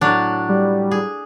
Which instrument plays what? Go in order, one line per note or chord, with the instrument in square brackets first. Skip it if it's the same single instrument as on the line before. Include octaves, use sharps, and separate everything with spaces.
[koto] A2 F#3 D4
[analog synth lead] G3
[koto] G#4